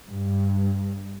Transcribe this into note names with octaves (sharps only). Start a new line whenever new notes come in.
G2